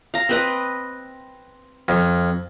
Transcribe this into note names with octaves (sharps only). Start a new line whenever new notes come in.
F5 A#5
C4 B4 D#5
F2